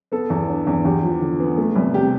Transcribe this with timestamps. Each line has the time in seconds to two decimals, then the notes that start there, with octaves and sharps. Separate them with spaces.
0.12 B3 A4
0.30 E2
0.48 D4
0.67 E2
0.85 E2 G4
1.03 F3
1.21 D3
1.40 B3
1.58 A3
1.75 C2
1.94 C3 G4